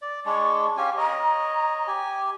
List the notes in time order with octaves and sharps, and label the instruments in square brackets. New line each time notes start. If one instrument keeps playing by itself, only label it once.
[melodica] D5
[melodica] G#3 D4 [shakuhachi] C#6
[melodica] C#4 G4 G#5 [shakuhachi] F5
[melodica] C#5 D#5 [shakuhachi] A#5
[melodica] G4 G#5